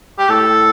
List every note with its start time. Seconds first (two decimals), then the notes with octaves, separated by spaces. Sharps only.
0.18 G4
0.29 A2 A4